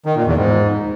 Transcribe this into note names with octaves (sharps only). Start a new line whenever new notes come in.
D#3
A#2
E2
G#2